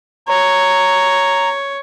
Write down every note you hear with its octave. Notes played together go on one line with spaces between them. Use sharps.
C#5 A#5